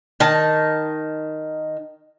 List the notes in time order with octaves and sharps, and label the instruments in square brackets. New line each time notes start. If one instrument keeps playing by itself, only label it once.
[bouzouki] D#3 A5